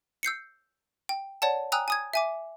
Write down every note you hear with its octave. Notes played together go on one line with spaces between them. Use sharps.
E6 G6 C7 C#7
G5
C#5 D5 F#5 A5
G5 G#5 A#5 D#6 E6 F#6
G#5 D#6 G#6
E5 G#5 D6